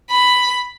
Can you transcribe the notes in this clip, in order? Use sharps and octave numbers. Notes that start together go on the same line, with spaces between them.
B5